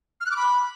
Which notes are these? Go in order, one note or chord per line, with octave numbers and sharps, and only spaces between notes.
F6
F#6
D6
B5